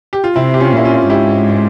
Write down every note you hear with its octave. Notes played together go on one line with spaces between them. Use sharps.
G4
F4
C3 C4 E4
G4
C#4 F4
A#2 E4
C#4 F4
G#2 E4 G4